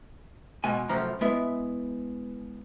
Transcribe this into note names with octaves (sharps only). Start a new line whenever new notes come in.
B2 G#3 G#5
F#2 A2 C3 F3 A#5
G#3 B3 E4